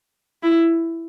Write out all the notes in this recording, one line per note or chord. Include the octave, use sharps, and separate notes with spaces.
E4